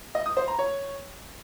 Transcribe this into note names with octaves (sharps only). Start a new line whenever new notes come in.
D#5
D#6
C5
A#5
C#5